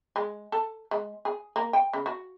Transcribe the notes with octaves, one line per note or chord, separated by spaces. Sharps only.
G#3
A4
G#3
G#4
A#3
G5
C#3
F#4